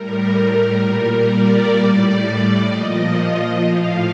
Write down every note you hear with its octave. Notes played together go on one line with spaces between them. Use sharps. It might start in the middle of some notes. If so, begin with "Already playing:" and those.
Already playing: A2 G3 A#4
A#2 G3
D5
A2 G3 D5
A#2 F3 D#5
A2 F3 F5